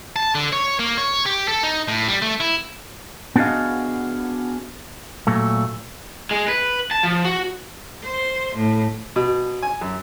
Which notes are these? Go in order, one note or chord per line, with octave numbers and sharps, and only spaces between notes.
A5
D3
C#5
A#3
C#5
G4
A4
D#4
A2
G3
A3
E4
B3 D4 F#4 G#4 D#5 F5
A#2 F#3 A3
G#3
B4
A5
F3
F#4
C5
A2
B2
G#5
F#2